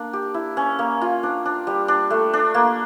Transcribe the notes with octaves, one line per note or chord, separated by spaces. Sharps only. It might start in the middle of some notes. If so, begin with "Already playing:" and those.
Already playing: A#3 D4
G4
E4
C#4
A#3
F4
D4
D4
G3
D4
A3
D4
A#3